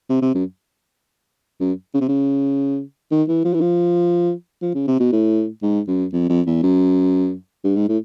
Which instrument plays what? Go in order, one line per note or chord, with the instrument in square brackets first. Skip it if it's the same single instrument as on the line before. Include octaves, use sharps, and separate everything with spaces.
[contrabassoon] C3
C3
F#2
F#2
C#3
C3
C#3
D#3
E3
F3
E3
F3
F3
C#3
C3
B2
A2
G#2
F#2
F2
F2
E2
F#2
G2
G#2
A2